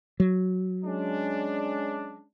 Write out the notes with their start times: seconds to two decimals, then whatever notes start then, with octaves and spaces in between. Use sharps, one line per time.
0.20 F#3
0.85 G#3 C#4 D4